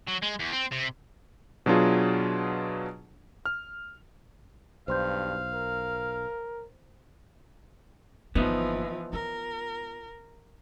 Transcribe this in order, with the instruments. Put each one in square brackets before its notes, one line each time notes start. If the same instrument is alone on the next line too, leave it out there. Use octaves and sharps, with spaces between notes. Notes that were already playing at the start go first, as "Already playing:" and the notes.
[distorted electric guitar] F#3
G#3
E2
C4
C3
[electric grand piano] B2 F#3 D4 F4 G#4
F6
[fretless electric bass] B1 [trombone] G2 [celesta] C5 C6 G6 [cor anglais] F5
[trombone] A#4
[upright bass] G1 A#3 [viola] E3 F3 [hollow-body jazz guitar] B3 D#4
[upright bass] F4 [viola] A#4